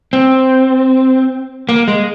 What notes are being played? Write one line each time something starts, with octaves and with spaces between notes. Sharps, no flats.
C4
A#3
G#3